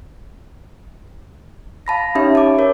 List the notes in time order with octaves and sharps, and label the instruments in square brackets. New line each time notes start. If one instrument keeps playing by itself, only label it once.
[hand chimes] F5 A5 B5 A#6
C#4 D#4 G4 C#5 E5 B5
A5 D6
A#4 C#5